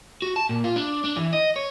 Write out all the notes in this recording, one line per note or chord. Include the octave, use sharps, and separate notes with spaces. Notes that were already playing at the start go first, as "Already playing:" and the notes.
F#4
A5
A#2
F4
D4
D4
E3
D#5
C#5